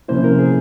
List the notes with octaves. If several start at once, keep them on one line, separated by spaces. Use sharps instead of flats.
C3 F3 A#3 C#4 E4 C5
A#4
G#4